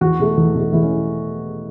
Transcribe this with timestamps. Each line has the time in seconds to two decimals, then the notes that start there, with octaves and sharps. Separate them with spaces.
0.01 E2 F#4
0.19 B2 A3
0.37 E2
0.55 B2 A3
0.73 E2 E4
0.82 C#4